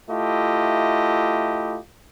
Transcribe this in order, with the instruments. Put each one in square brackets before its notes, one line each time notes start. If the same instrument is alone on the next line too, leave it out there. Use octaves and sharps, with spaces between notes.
[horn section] A3 E4 F4 G4 D#5